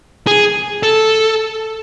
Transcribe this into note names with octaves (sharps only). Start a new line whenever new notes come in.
G#4
A4